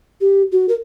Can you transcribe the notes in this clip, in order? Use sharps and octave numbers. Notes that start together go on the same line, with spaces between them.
G4
F#4
A#4